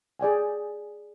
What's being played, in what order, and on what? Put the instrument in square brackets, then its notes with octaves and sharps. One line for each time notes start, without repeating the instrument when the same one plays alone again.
[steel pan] G#4 D5 G5 G#5